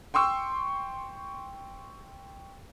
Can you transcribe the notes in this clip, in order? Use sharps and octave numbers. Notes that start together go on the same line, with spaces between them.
G5 C6 C#6 E6